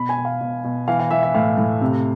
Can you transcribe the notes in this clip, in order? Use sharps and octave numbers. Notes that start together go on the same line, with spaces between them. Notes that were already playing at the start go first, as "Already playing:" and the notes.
Already playing: B2 B5
G#5
B2
F5
B2
B2
E3 F5
F5
E3 E5
E5
A2 F5
A2
C3